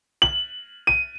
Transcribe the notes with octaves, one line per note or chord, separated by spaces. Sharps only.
F#7
D#7